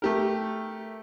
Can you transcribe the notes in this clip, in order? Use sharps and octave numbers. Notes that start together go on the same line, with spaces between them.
A3 G4 A#4